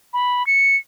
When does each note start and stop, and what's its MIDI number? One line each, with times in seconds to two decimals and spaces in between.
0.14 0.45 83
0.47 0.76 97